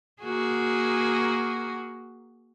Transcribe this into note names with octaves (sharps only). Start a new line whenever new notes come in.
A#3 F#4 G#4